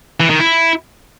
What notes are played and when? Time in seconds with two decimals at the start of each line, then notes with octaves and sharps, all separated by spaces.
0.20 E3
0.30 D#3
0.40 E4